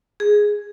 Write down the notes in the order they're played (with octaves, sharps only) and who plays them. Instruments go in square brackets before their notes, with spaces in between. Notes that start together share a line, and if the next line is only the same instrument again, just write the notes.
[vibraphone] G#4